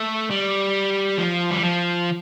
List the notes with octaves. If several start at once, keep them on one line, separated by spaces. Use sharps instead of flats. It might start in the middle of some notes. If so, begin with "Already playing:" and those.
Already playing: A3
G3
F3
G3
F3